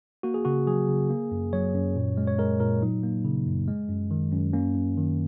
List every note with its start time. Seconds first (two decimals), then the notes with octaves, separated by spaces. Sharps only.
0.23 A#3 F#4
0.34 G#4
0.45 C#3 F#4
0.67 F#3 G#4
0.88 C#3
1.10 A#3
1.31 F#2
1.53 F#3 C#5
1.74 F#2
1.96 A#2
2.17 G#3
2.27 C#5
2.39 G#3 A#4
2.60 A#2 A#4
2.82 F#3 D#4
3.03 A#3
3.25 C#3
3.47 F#2
3.68 G#3
3.89 F#2
4.11 D#3
4.32 F#2
4.53 A#3 C#4
4.75 F#2
4.97 D#3